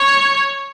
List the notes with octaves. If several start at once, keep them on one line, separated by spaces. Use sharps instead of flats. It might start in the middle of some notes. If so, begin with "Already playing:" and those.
Already playing: C#5